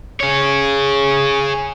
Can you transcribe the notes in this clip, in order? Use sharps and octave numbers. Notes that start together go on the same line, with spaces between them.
G#4 C#5